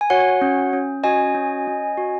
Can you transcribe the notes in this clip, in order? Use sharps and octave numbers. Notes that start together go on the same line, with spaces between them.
G#5
F#4 C#5 F#5
C#4
C#4
F#4 D#5 G#5
C#4
C#4
F#4